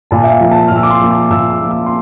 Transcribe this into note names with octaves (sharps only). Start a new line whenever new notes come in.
A#2 A5
E5
F5
F3 A#3
A5
F6
A#2 E6
D6
C6
F3 A#3
D6
A#2 E6
D6
F3 A#3
E6
C6